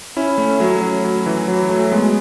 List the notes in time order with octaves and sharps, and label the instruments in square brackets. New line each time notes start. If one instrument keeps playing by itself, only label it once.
[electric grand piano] C#4 E4
A3 C#4
F#3 A3
F#3
F#3
E3
F#3
F#3 A3
G#3 B3